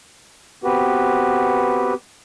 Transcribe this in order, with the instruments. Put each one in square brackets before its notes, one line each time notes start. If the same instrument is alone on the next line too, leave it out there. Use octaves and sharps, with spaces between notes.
[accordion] B3 C4 F#4 G4 B4